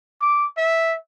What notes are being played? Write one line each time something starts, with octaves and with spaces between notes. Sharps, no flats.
D6
E5